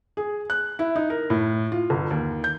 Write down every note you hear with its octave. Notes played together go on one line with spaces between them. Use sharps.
G#4
F#6
E4
D#4
A#4
A2
F4
G1
D#2
G6